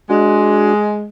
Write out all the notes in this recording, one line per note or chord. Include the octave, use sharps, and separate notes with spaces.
G#3 D4 F#4